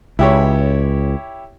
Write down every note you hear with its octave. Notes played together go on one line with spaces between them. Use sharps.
C#2 E4 G4 C#5